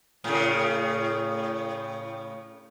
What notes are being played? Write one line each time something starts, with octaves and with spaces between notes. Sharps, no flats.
A2 C#3